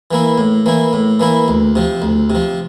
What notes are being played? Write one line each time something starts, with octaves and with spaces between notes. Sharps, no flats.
E3 A#3 E4
A2
E3 A#3 E4
A2
E3 A#3 E4
D2
C3 F3
D2
C3
F3